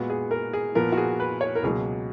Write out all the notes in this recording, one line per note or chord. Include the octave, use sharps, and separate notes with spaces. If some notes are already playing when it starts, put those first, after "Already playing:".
Already playing: A#2 G#3 B3 F#4
G#4
A#4
G#4
A#2 F3 B3 A#4
F#4
G#4
B4
C#5
A#4
C#2 B2 F#3 A#3 G#4